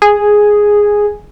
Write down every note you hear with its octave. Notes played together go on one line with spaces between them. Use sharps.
G#4